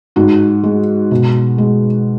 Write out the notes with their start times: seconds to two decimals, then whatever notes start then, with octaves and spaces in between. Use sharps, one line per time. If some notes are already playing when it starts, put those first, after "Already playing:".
0.16 G#2 F#4
0.63 G#3
1.11 B2
1.58 G#3